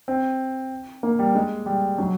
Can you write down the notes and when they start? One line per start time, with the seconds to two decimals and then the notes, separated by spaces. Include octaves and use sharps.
0.08 C4
1.03 A#3
1.19 G3
1.35 G#3
1.66 G3
1.98 F#3